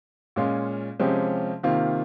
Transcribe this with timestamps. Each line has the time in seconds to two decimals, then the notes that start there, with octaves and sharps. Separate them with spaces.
0.36 A#2 G#3 C#4 F4
1.00 C3 F3 G#3 C#4 G4
1.63 C3 D#3 A#3 F4